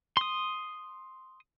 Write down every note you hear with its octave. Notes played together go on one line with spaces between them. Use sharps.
C6 D#6